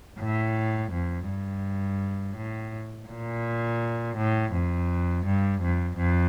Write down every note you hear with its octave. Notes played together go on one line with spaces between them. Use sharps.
A2
F2
G2
A2
A#2
A2
F2
G2
F2
F2